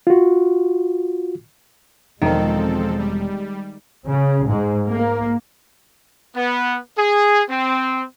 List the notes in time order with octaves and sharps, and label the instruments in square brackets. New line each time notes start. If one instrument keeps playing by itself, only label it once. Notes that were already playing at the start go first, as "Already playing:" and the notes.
[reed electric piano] F4 F#4
[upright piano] E1 A#4 [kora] D#3 [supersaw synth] F3 C4 A4 [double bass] G#3
[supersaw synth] G3
[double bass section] C#3
G#2
A#3
[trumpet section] B3
G#4
C4